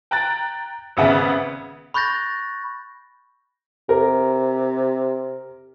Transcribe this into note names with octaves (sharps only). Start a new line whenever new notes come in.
G5 A#5 F#6 A6
G#1 C#3 B3 E5
B5 C#6 F#6 G6 A6 A#6
C3 A#4